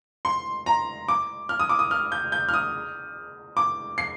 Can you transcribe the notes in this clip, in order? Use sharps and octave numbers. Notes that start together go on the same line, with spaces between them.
C6
A#5
D6
F6
D#6
D6
D#6
F6
G6
G6
F6
D#6
D6
C7